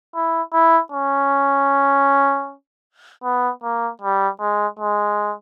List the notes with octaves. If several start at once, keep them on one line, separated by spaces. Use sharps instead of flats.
E4
E4
C#4
B3
A#3
G3
G#3
G#3